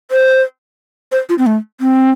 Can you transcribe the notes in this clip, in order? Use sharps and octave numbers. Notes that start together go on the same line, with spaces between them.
C5
C5
F4
C4
A3
C4